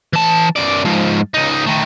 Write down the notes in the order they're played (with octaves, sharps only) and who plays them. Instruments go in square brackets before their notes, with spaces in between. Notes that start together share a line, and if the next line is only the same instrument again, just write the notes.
[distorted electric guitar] E3 A5
F#2 D5
G#2 F3
C#2 D#4
D#3 A3